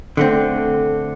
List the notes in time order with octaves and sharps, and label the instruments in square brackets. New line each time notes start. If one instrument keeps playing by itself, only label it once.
[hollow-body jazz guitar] D3 A3 C4